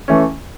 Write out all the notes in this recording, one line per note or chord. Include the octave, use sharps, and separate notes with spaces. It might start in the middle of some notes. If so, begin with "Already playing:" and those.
E3 A3 C#4